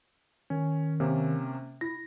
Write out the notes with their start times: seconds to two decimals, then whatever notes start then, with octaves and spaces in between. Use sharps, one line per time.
0.50 D#3 C#4
1.00 C3 A#3 C#4
1.81 E4 A#6